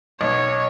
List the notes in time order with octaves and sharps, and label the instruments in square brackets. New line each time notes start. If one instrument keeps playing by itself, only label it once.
[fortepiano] B1 [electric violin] C#5